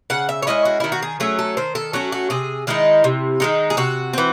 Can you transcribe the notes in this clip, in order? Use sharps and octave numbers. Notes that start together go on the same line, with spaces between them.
C#3 F#5
E5
C#5
G#3 C#4 E4 D#5
F#4
D#3 E4
F#4
G#4
F#3 A3 C#4 G#4
A4
D#3 C5
A4
F#3 A3 C#4 F#4
F#4
C3 G#4
D#3 G#3 D#4 E4
C3
D#3 G#3 D#4
G#4
C3 F#4
E3 C4